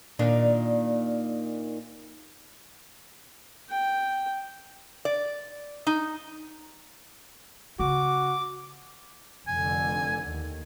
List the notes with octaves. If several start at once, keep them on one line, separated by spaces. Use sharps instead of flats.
A#2 D#3 D4
G5
D5
D#4
C#3 F#4 D6
F1 D3 G#5
D#2